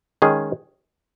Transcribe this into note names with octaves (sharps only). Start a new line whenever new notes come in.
D#3 G#3 C#4 G#4